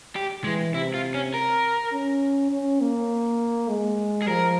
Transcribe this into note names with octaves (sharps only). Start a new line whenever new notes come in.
G4
E3 G#3
C3 E4
F4
C#4
A#4
C#4
C#4
A#3
G#3
G#4
F3 A#4